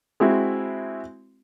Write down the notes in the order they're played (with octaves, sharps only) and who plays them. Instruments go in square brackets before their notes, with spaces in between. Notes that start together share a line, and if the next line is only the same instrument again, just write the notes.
[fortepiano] G#3 C4 E4 F#4